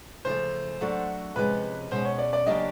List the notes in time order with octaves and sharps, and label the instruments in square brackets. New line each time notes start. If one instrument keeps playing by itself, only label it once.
[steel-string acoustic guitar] C#3 F3 A3 [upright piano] C5
[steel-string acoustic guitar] F#3 A3 D4 F#4 A4
[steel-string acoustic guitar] C3 F3 G#3 C#4 [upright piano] B4
[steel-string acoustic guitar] B2 G#3 C#4 [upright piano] C5
[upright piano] C#5
D5
D5
[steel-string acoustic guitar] C#3 F#3 A#3 D4 G4 [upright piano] D#5